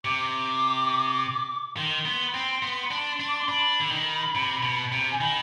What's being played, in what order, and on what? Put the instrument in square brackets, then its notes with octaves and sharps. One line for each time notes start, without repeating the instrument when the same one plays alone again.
[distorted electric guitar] C3 [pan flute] D6
[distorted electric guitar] D#3 [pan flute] C6
[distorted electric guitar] B3
C4
B3
D4
D4
[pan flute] D6
C6
[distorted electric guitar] D4 [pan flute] B5
[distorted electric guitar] D3
D#3
C3
B2
C3
[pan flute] G#5
[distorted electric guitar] D#3 [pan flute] B5